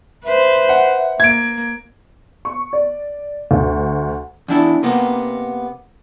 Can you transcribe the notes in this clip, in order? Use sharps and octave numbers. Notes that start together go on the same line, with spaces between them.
B4 C5 E5
F#5
A#3 G#6 D7
C#6
D5
D2
E2 D4 E4
C3 A#3 B3